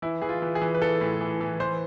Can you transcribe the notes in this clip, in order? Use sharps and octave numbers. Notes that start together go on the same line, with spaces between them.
E3 E4
E3 G#4
F4
E3
G#4
E3
B4
E3 A4
A2
E3
E3
E3 C5